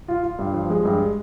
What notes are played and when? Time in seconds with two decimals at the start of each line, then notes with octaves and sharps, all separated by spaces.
0.08 F4
0.23 F4
0.39 G2
0.54 F3
0.70 G#3
0.85 G2